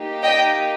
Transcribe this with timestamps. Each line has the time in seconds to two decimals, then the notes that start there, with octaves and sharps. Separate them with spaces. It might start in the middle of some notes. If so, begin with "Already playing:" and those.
Already playing: A#3 D#4 G4
0.23 D#5 G5